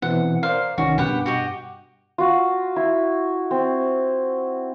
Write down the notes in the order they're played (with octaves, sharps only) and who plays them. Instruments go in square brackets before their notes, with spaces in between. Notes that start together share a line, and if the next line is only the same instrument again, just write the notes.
[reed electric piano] B2 E3 C4 [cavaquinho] F#5
[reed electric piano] A#4 C5 D5 [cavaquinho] F5
[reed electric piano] C2 D#3 C#4 [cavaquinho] F#4
[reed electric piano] G2 B2 [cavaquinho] G4 B4 F#5
[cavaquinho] F#4 G4 D#5
[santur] F4 F#4
E4
C4